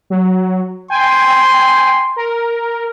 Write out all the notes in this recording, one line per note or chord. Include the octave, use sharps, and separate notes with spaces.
F#3
G5 G#5 C6
A#4